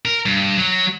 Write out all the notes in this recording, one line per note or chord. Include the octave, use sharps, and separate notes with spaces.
A#4
G2
F#3